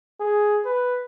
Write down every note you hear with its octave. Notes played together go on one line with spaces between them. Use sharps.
G#4
B4